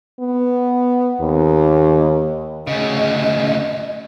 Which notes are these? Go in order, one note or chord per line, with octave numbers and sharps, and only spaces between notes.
B3
D#2
D2 C#3 D#5